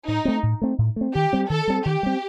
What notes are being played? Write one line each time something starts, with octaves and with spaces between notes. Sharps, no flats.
A2 D#4
A3 C4
A2
A3 C4
A2
A3 C4
D#3 G4
G3 C4
D#3 A4
G3 C4
D#3 G4
G3 C4